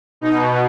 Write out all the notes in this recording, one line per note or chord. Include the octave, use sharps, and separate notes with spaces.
B2 D#4